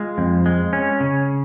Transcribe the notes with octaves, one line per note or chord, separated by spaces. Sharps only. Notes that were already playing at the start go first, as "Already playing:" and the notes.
Already playing: G#3 F4
F2
G#3
C#4
C#3